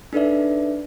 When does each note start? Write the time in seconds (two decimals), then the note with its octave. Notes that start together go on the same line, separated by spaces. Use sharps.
0.13 D4 D#4 A4 B4 D5 E5